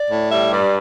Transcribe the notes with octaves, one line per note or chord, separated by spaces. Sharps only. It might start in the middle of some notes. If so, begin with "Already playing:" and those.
Already playing: D5
A2
G3 E5
G2 D5